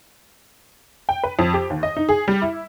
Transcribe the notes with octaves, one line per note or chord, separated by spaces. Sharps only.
G5
B4
F2
G4
D#2
D#5
D#4
G#4
G3
E4